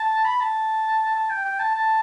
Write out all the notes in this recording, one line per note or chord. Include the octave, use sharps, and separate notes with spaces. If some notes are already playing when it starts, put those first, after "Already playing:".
Already playing: A5
B5
A5
A5
G5
G5
A5
A5